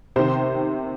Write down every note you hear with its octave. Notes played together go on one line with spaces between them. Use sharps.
C3 D#3 C5